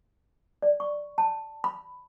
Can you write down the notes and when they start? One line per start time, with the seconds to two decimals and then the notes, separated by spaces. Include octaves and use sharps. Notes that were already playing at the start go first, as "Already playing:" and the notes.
0.62 D5
0.80 C#6
1.18 A5
1.64 B5